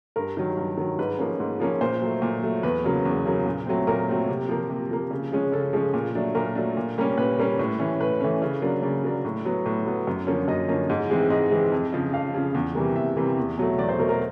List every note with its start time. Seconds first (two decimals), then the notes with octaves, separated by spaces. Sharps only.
0.16 G2 A#4
0.37 D#3 F#3
0.57 G2
0.77 D#3 F#3
0.99 G#2 B4
1.19 F3 A#3 C#4
1.40 G#2
1.60 F3 A#3 C#4
1.81 A#2 C5
2.01 F#3 A3
2.22 A#2
2.43 F#3 A3
2.63 E2 B4
2.84 C#3 F#3 A#3
3.05 E2
3.25 C#3 F#3 A#3
3.46 A#2
3.66 F#3 A3 C4
3.87 A#2 A#4
4.09 F#3 A3 C4
4.29 C3
4.49 F3 A#3
4.70 C3
4.90 F3 A#3
5.11 C#3
5.32 F3 G#3 C#4
5.52 C#3 A4
5.73 F3 G#3 C#4
5.94 A#2
6.15 F#3 A3 D4
6.35 A#2 A#4
6.55 F#3 A3 D4
6.77 A#2
6.98 G3 A#3 C#4
7.18 A#2 B4
7.39 G3 A#3 C#4
7.59 A2
7.79 E3 A3 C#4
8.00 A2 B4
8.21 E3 A3 C#4
8.42 C#3
8.62 F#3 A#3 D4
8.83 C#3 D5
9.04 F#3 A#3 D4
9.25 A2
9.45 F#3 B3
9.66 A2
9.86 F#3 B3
10.07 F#2
10.27 D3 F3 A#3 C#4
10.48 F#2 D#5
10.69 D3 F3 A#3 C#4
10.90 G#2
11.10 E3 G#3 C4
11.30 G#2 D#5
11.51 E3 G#3 C4
11.72 F2
11.93 C#3 F3
12.13 F2 F5
12.34 C#3 F3
12.55 E2
12.75 C3 E3 G3 A#3
12.95 E2 E5
13.16 C3 E3 G3 A#3
13.37 E2
13.58 B2 F#3 A3
13.78 E2 D5
13.89 C5
13.98 B2 F#3 A3 A#4
14.09 A#4